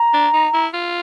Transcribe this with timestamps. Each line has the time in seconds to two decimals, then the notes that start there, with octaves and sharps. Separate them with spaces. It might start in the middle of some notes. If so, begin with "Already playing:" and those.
Already playing: A#5
0.14 D4
0.33 D#4
0.54 E4
0.74 F4